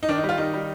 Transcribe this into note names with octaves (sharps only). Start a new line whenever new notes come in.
D#4
D#3 D4
D#4
G3
F4
D#3 D#4
G3